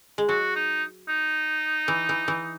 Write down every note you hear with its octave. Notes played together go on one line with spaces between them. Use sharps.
G#3
F#3 F#4
D#4
D#4
E3
E3
E3